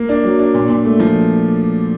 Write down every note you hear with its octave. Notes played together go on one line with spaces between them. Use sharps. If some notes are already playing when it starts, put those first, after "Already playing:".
Already playing: A#3
D4
F#3
D4
A#2
A#2
A3
F3